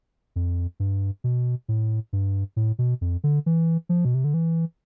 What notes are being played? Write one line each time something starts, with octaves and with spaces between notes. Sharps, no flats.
F2
G2
B2
A2
G2
A2
B2
F2
D3
E3
F3
B2
C3
D3
E3